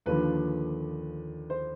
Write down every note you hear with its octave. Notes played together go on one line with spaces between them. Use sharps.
D#2 D3 F3 B4
C5